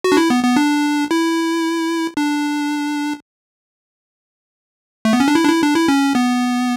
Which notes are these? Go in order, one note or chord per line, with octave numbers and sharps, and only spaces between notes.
F#4
D4
E4
B3
B3
D4
E4
D4
A3
B3
C#4
D4
E4
D4
E4
D4
E4
C#4
B3